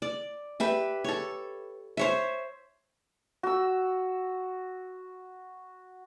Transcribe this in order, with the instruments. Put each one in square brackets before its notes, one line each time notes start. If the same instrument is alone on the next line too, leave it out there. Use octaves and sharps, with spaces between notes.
[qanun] D5
G4 B4 E5
A4 C#5
C5 C#5 E5
[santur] F#4 E6